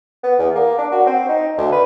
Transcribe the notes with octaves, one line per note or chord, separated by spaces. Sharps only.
B3
E2
A#3
D4
F#4
C4
D#4
D2
B4